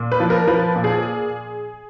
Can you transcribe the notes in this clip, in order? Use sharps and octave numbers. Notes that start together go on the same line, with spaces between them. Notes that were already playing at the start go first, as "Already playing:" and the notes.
Already playing: A#2
B4
F3
A#4
F3 B4
A#2
G#4